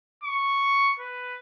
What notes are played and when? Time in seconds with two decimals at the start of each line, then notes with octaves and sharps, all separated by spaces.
0.24 C#6
0.99 B4